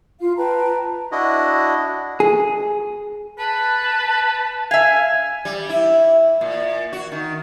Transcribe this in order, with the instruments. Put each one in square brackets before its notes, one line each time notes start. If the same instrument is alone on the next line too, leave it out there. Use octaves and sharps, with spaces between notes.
[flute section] F4 F5
B4 G5 A5 A#5
[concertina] D4 E4 F#4 D#5
[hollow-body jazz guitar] G#4
[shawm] B4 [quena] A5
[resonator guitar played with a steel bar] E5 F5 [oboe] G#5
[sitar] G3
E4
A#2
F#4
D#3